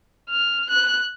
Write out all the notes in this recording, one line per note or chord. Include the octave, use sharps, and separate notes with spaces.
F6
F#6